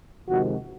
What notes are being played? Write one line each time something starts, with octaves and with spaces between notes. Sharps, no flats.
F2 C3 D#3 G#3 F#4